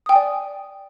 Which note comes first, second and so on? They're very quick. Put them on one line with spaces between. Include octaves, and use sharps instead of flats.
D#6 G5 G#5 D5